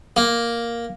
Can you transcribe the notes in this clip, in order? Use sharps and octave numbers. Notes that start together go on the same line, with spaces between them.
A#3